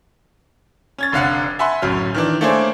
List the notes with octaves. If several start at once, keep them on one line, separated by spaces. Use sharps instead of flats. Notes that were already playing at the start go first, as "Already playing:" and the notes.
C#4 G#6 A6
F1 D3 F5 F#5
E5 F#5 G#5 A5 B5 C6
D1 F#2 F#3 F6
D#3 E3 D4
A3 A#3 D4 G#4 C5 C#5